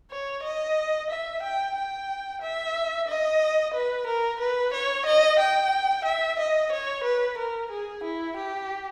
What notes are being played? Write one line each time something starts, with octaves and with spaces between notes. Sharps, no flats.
C#5
D#5
E5
G5
G5
E5
D#5
B4
A#4
B4
C#5
D#5
G5
E5
D#5
C#5
B4
A#4
G#4
E4
G4